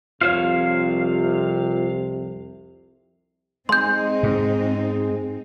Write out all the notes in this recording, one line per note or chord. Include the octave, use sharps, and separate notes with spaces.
C2 F2 C3 F4 C5 C#5 F5
G#3 C4 D#4 C6 G6
G#2